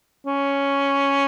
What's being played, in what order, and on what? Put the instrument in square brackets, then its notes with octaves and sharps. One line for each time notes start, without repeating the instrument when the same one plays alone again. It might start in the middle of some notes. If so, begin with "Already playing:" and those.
[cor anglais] C#4